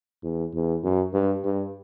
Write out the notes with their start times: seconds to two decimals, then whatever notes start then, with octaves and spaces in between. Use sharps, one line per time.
0.23 E2
0.54 E2
0.83 F#2
1.13 G2
1.44 G2